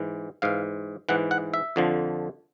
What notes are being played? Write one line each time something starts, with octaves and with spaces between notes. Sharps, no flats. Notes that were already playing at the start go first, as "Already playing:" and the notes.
Already playing: G#2 E3
G#2 E3 F5
G#2 E3 F#5
F#5
E5
F2 D3 F3